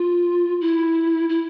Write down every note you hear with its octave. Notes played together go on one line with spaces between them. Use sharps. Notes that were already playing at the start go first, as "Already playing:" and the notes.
Already playing: F4
E4
E4